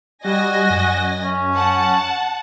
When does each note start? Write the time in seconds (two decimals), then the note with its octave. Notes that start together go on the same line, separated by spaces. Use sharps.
0.25 G3 F#4 D#5 G#5 A#6
0.70 F#2
1.24 C#4
1.56 F#5 A5